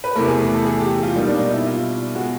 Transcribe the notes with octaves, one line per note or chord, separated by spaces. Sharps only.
B4
E2 C3 E3 A3 A#4
G#4
G#4
A4
G#4
G4
F4
B2 G3 A#3 D#4
D4
D#4
E4
F4
B2 G#3 F#4